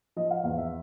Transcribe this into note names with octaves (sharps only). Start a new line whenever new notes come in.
F3 D#5
F5
E2 F5
E5